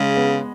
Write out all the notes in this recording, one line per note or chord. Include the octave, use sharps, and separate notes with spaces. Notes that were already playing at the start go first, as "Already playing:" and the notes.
Already playing: C#3 G#3
B3